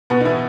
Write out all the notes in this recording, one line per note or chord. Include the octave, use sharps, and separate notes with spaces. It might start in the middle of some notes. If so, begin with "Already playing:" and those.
B2 B3
D#4
E3 E4